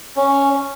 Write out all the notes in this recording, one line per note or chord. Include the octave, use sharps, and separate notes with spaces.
C#4